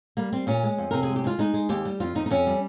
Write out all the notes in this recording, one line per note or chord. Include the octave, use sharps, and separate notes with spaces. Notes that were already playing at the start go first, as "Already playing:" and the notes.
G3 A#3
G3 C4
A#2 C#4
G#3
F2
C3 A#4
G#4
G#3
G4
G#3 F4
G#3 D#4
G#3
D#2 G4
G3
F2 F4
F2 D#4
D#4
F2 C#4
G3